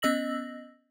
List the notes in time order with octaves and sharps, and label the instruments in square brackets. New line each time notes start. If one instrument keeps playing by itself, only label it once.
[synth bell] B3 C#4 D#5 E6 A#6 F#7